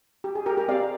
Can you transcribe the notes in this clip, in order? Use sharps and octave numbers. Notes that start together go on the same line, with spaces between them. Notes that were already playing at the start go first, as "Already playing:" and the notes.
G4
G#4
G4 A#4
G4 A#4
C4 G4 D5 F5